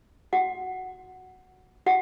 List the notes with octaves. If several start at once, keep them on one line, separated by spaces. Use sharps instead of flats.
F#4 F#5
F#4 F#5